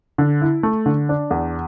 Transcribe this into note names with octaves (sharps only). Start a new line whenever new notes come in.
D3
E4
A3
D3
D4
E2